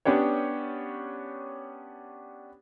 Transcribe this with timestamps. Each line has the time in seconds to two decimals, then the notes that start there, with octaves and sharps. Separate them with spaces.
0.05 B3 C#4 D4 G4 C#5